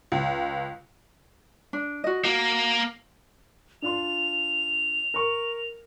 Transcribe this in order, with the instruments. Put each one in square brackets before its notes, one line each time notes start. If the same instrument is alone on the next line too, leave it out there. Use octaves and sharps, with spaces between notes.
[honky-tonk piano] C#2
[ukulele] D4
F#4 D#5
[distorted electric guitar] A#3 [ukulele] F#4
[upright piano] D4 F4 C6 [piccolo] F7
[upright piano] A#4 C#6